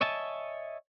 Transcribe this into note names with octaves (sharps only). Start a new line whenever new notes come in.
C#5 D#5 E5 G#5 A5